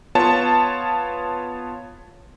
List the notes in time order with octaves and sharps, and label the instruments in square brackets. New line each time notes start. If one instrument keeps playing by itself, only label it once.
[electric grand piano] B3 F4 C#5 A5